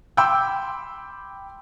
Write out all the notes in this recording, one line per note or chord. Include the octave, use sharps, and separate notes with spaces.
G5 B5 C6 D6 E6 G6